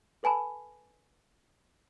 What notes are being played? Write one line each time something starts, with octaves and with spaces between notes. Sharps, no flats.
A4 B4 G#5 A5 B5